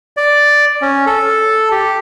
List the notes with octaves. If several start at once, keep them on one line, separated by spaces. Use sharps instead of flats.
D5
C#4
A4
G4